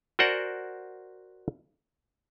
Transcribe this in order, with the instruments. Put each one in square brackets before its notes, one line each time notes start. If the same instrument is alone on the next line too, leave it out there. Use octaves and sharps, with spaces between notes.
[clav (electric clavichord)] F#4 A#4 C5 D5 F#5 G#5